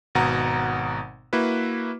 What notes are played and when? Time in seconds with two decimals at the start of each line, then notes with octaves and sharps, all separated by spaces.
0.15 G#1 B2 F#5 A#5
1.33 A#3 E4 F#4 B4